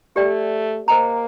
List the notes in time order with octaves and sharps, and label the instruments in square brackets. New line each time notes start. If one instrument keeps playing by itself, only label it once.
[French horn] A3 [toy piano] G4 D5 G5
[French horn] A#3 [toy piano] C5 D#5 G5 A#5